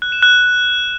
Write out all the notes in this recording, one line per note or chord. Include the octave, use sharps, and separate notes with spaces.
F#6
E7
F#6